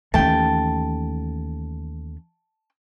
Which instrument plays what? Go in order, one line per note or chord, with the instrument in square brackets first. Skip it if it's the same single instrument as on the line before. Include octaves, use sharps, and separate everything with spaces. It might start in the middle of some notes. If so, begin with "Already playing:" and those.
[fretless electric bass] D#2 A3 [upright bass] E3 C#4 [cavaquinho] G5 A5